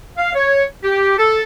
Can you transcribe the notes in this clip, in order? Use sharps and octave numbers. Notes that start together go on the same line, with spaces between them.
F5
C#5
G4
A4